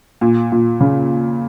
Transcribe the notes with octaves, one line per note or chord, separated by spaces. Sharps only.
A#2
A#2
C#3